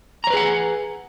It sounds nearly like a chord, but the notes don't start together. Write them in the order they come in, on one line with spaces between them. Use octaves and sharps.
A#5 C#5 B4 G#4 F#5